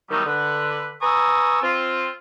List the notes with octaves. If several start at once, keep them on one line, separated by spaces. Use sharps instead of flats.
D#3 F#3 G3 A3 B3 D#4
D3 B4
B4 G#5 A#5 C#6 D#6 E6
C4 F4